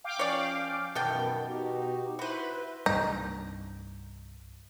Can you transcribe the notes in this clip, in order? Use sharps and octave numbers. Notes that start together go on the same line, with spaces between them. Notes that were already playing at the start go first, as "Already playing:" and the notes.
F5 G5 D6
F3 C#4 C#5 D5
F#2 B2 D#3 E3 B3 A4 G5
D#4 F#4 G4
E4 F#4 B4 C5
C2 G2 G3 D#4